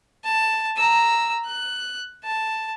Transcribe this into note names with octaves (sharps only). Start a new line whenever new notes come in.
A5
A#5 E6
F#6
A5